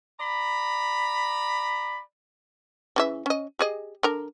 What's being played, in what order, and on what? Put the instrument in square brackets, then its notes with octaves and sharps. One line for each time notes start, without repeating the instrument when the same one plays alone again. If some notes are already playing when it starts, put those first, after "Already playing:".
[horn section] D5 A#5 B5
[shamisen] C#3 E3 E5
C#4 D#5
G4 G#4 D#5
D3 A#4 A#5